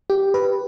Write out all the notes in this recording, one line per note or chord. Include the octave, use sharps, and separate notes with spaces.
G4
B4